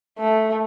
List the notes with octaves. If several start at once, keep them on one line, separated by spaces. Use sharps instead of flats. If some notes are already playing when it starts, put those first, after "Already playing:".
A3